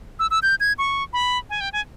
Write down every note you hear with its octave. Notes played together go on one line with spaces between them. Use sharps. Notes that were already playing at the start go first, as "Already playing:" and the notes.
E6
E6
G6
G#6
C#6
B5
G#5
G5
G#5